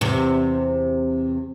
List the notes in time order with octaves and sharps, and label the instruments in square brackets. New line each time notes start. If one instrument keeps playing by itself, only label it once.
[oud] E2 C3